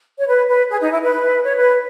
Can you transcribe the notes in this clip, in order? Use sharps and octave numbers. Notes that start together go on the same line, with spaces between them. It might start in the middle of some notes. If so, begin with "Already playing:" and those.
C#5
B4
B4
G#4
D#4
E4
B4
C#5
B4